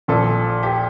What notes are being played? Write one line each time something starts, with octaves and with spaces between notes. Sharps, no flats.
A#1 A#2 F3 A4
G4